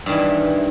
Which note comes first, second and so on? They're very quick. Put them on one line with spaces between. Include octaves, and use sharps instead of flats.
G2 D#3 E3